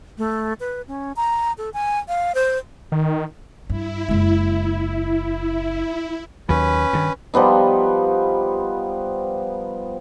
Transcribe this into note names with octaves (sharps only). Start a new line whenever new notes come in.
A3
B4
C#4
A#5
A4
G#5
F5
C5
D#3
G2 E4
F#1 G#3
D#2 F#3 C#4 B4
G2 D#3
F3 G3 B3 D#4